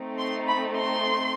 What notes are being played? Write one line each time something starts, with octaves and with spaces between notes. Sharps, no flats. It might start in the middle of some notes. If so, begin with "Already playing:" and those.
Already playing: A3 C4 D#4
C6
B5
C6